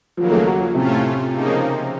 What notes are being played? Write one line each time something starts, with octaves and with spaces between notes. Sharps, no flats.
D#2 C#3 F3 F#3 A#3
A3
F#3
F3
A2 C3 A3 C#4 F4
C#3 F3 A#3 D#4